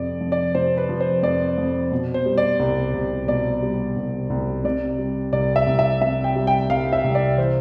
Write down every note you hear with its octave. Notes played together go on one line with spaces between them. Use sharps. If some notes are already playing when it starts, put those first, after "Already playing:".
Already playing: F2 C3 F3 D5
F2
D5
C3 C5
B4
F3
C5
F2 D5
F2
B2
C5
G3
D5
C2
C2
B2 D5
G3
C2
C2
C3 D5
G3
C2 D5
E5
C2
E5
C3 E5
G5
G3
G5
C2 F5
E5
C2
D5
E3 C5